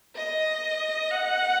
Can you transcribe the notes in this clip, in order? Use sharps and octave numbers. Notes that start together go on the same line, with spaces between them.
D#5
F#5